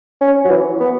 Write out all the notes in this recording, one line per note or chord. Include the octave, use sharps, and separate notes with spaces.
C#4
F#3
E3
B3